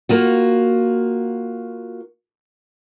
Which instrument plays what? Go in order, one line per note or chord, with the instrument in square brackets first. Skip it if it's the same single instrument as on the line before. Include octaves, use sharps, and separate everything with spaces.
[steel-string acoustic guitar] A#3 F4 F#4